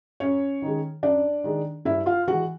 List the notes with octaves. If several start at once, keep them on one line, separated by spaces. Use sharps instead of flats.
F#2 C#4 C#5
D#3 G#3
F#2 D4 D5
D#3 G#3
G2 E4 E5
F4 F5
E3 G#3 F#4 F#5